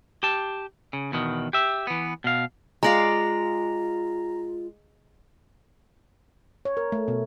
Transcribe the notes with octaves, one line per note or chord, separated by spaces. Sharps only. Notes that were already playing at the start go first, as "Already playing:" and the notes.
G4 A5
C#3
E2 B2 D#3
G4 E5
E3 B3
B2 F5
G#3 F4 D5 F5 A#5 A#6
C#5
A#4
A3
B2